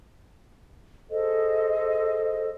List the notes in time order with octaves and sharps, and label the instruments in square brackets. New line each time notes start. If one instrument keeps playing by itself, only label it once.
[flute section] G#4 A4 C5 D#5